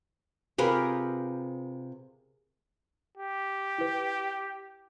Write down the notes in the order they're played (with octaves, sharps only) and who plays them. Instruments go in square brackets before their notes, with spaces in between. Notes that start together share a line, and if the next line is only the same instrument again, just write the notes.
[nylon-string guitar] C3 F4 B4 [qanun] G4 G#4 A#4
[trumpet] G4
[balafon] E4 B4